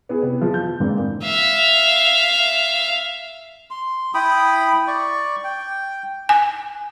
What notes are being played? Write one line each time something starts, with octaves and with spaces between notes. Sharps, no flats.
B3 E4 G#4
C3 B3
F3 G#4
G6
G#2 D3 E3 A#3 C4
E5 F5
C6
E4 G5 B5 D#6
D5 C#6
G5
G#5